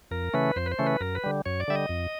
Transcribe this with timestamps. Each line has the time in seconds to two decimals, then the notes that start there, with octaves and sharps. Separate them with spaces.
0.11 F2 A#4
0.34 C#3 E3 A3 C#4 B4
0.56 F2 C5
0.66 B4
0.72 C5
0.79 C#3 E3 A3 C#4
0.86 B4
1.01 F#2 A#4
1.15 B4
1.24 D3 G3
1.45 F#2 C#5
1.60 D5
1.68 D3 G3 E5
1.75 D#5
1.89 F2